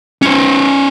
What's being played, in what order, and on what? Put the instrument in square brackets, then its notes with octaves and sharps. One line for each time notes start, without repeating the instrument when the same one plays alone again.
[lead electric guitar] C#4 C5